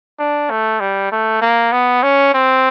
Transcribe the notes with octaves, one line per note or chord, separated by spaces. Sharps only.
D4
A3
G3
A3
A#3
B3
C#4
C4